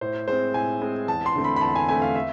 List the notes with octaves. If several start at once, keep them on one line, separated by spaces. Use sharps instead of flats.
A2 C5
G#3 C4 C5
A2 G#5
G#3 C4
E2 A5
C6
D3 A3 C4
B5
B5
E2 A5
G#5
D3 A3 C4 G#5
F5
E5